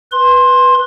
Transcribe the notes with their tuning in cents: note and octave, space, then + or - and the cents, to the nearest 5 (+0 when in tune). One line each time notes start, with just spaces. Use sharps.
B4 -5 C6 +15